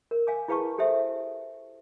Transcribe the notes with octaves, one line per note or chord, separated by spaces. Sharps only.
A#4
F5 G#5 D6
E4 G#4 B4 F5 A5 C#6
G4 A4 C5 E5